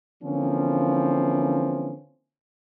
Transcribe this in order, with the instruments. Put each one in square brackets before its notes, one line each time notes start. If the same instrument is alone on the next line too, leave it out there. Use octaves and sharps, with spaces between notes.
[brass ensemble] D3 E3 F3 A#3 C4 C#4